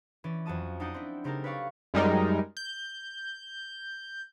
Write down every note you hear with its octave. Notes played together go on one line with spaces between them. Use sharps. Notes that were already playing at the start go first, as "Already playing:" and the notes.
E3 C#4 D5
F2 F#3 F#4 A5 D#6
D4 D#4 D5 F#5 D#6 G6
C4 E4
C#3 C4 D#4 G4 A4 A#4
B4 C#5 D5 F5 C#6
F#2 G3 G#3 D#4 A#4
G6